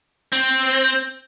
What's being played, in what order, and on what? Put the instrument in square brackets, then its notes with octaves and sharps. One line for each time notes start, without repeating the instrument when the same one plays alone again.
[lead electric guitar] C4